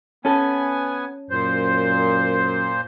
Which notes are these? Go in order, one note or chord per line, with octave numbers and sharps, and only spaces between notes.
B3 C#4 A4 G#5
F#2 A#2 C5